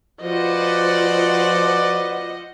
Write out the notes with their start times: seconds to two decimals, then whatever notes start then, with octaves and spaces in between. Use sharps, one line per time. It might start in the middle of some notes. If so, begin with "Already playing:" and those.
0.22 F3 F4 F#4 B4 C5 D5 D#5 F#5